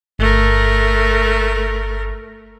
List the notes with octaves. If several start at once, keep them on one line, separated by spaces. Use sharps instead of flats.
G1 A3 A#4